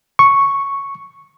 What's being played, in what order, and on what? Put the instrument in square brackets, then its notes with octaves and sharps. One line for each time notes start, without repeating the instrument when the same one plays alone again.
[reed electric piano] C#6